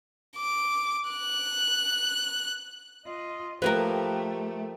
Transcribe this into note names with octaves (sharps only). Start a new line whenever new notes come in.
D6
F#6
F4 D#5
F3 A3 A#3 G4 A#4 B4